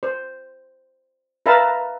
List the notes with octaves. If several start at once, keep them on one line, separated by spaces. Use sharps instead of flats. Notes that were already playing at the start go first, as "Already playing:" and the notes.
C5
A#4 B4 E5 F5 A5